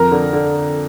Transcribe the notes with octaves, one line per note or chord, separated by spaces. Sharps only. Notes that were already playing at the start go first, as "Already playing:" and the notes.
Already playing: F2 A#4 A#5
D3
D3